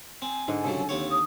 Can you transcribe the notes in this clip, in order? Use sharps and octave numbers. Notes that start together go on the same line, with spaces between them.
C4 G#5
G#2 D3 G#3
C2 C#3 F#3 A4
D#2 C4 C#5
D#6